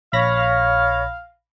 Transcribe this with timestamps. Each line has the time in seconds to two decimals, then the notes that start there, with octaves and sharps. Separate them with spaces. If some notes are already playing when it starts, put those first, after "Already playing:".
0.13 A#1 C#5 F5 B5 A#6